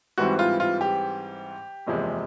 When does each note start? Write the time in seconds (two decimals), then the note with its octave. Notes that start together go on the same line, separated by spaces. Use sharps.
0.18 G#2 E3 G3 C4 F#4
0.39 F4
0.60 F4
0.81 G4
1.86 F#1 E2 C3 F3 G#3